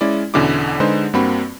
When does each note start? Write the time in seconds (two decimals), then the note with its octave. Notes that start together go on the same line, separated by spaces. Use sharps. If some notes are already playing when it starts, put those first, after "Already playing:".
0.01 G#3 C#4 E4 D5
0.34 E2 B2 D3 C#4 E4 D6
0.80 D3 G#3 D#4 G#4 B4 C5
1.14 G2 A#3 C4 F#4 B5